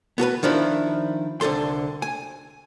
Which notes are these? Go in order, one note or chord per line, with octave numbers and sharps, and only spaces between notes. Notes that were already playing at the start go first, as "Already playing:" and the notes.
B3 F#4 A4 B4
D#3 F3 D4 E4
C2 D3 A4 C6
G#5